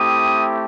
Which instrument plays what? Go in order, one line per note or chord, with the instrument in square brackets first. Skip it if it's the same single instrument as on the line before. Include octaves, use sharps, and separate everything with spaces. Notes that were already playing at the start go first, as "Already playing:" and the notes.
Already playing: [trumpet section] A3 C4 E4 G4 D#6